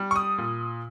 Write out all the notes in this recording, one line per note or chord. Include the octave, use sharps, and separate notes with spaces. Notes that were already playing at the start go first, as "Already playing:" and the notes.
Already playing: G3
C#6
D#6
A#2